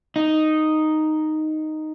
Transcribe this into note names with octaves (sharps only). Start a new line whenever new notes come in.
D#4